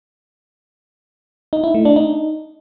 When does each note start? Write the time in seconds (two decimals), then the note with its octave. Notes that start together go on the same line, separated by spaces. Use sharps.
1.53 D#4
1.64 E4
1.74 A3
1.85 D4
1.96 D#4